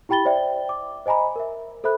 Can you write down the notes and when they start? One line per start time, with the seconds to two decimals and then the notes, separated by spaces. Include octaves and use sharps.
0.09 E4 G4 G5 B5 A6 G7
0.25 C5 D5 E5 G5
0.69 D6
1.06 C5 D#5 G#5 A#5 B5
1.36 A#4 E5
1.84 A4 C5 E5 B5 F#6